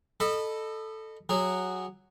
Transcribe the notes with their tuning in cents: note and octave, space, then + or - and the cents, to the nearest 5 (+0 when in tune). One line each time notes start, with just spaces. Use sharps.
A4 +0 D#5 -30 B5 +0
F#3 +0 G#4 -20